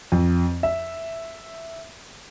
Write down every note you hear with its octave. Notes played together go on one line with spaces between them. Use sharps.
F2
E5